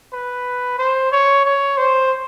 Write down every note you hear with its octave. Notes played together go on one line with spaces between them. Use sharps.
B4
C5
C#5
C#5
C5